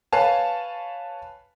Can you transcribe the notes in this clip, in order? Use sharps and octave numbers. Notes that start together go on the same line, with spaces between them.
B4 C#5 F5 G#5 A5